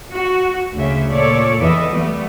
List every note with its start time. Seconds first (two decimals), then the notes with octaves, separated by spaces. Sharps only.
0.11 F#4
0.74 D2 C#3 E5
1.10 A#2 A4 C#5 D5
1.60 E2 E3 B3 A4 D#5 E5
1.91 G3 A3 B3